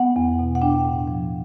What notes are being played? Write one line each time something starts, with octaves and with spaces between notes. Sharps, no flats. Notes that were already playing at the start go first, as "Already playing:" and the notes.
Already playing: B3 F#5
E2
B2
F#5
D4 G5
A2
F3